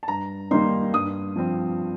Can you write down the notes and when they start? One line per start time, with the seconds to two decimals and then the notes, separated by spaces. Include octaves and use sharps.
0.03 A5
0.08 G2 A#5
0.51 D#3 G3 A#3 D#4 C6
0.93 G2 D#6
1.36 F3 C4